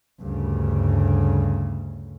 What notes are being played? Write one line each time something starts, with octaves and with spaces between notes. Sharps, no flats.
D2 G2 C#3